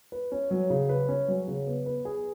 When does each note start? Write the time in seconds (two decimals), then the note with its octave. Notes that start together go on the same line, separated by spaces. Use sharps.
0.12 B4
0.32 C#4
0.51 F#3
0.70 C#3
0.89 B4
1.09 C#4
1.28 F#3
1.48 C#3
1.67 B3
1.86 B4
2.05 G#4